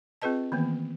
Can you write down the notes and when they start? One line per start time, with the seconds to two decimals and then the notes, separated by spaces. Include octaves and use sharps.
0.22 C4 F4 G#4 B4 D#5 A5
0.52 D#3 E3 A#3 B3